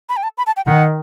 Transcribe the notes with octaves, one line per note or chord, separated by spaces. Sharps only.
B5
G5
A5
B5
A5
G5
D#3 F#5